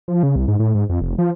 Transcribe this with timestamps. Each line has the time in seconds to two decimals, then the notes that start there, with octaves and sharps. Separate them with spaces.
0.08 F3
0.23 C#3
0.36 C2
0.48 G#2
0.59 A2
0.75 G#2
0.90 F2
1.01 F1
1.19 F3